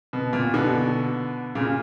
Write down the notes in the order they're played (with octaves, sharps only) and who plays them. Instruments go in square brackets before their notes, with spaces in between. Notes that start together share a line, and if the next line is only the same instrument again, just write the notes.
[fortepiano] B2
A#2
B2 D3
A#2 C#3